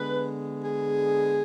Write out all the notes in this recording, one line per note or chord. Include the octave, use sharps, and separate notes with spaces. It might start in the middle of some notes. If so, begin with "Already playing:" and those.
Already playing: D3 G#3 B3 B4
G#4